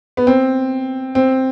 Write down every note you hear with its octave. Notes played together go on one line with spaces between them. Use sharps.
B3
C4
C4